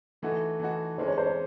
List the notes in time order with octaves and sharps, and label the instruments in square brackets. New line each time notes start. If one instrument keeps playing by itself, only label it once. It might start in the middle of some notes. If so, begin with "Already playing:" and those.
[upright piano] E3 A3 D#4 F#4 [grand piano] A4
[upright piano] E3 A3 D#4 F#4
[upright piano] E3 G#3 C#4 [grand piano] C5
[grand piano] C#5
C5
C#5